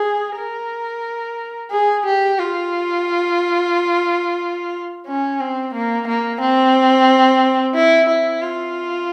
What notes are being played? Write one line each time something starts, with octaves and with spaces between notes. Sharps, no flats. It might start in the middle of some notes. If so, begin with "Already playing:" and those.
Already playing: G#4
A#4
G#4
G4
F4
C#4
C4
A#3
A#3
C4
E4
E4
F4